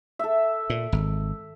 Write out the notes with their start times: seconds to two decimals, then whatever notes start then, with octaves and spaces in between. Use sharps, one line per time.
0.19 A4 E5
0.70 A#2
0.92 G#1